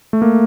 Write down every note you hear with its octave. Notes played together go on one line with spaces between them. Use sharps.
A3
A#3